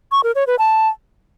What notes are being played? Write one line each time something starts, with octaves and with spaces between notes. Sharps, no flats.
C#6
A#4
C#5
B4
A5